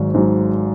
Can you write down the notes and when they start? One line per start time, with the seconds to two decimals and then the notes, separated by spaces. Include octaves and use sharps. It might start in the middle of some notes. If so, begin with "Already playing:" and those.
Already playing: G#1 G#2 F#3
0.14 G#2 F#3